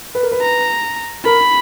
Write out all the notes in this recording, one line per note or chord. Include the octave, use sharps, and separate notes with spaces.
B4
A#4
B4
A#5
A#4 B5